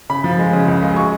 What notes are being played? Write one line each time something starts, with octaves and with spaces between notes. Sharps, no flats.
C#3 B5
F3
G#3
C#3
C#2
G#3
C#6